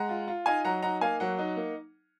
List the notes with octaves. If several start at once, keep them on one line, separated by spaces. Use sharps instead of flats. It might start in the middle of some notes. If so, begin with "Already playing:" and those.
Already playing: G#3 F#5 A#5
F4
F4
D#4 F5 G#5
F#3 F#5 A#5
D#4 F#5 A#5
A#3 F5 G#5
F#3 F#5
D#4
A#3